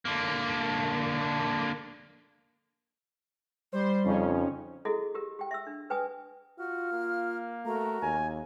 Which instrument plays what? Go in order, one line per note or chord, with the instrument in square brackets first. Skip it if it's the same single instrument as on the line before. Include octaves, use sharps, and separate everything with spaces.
[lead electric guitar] D3 A#3
[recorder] G3 [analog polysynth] C5 C6
[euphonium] F2 [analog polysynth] C#3 C#4 D#4
[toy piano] E4 F#4 G#4 A4 D#5
G4 A#4
G4 G5
E5 E6
D4
B4 G5 G#5 D#6
[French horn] F4 [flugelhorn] F#4 [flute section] F6
[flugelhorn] A#3
[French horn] A3 [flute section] F#4 A#4 A#5
[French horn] D#2 [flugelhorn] G#5